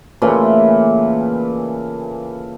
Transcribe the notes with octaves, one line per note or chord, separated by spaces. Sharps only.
A#2 C#3 E3 A3